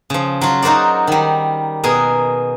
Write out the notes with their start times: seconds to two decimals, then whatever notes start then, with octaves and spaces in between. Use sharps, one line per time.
0.10 C#3 F3
0.41 F#3 F4
0.62 D#4 F#4 A#4 C5 D5
1.07 D#3 G3
1.84 B2 G#4 A#4